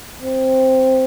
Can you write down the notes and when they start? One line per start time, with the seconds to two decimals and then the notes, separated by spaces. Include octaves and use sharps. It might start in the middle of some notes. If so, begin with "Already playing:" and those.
0.22 C4